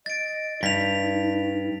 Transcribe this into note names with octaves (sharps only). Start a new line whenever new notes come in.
D#5 A6 D7
G2 D#4 B6 F7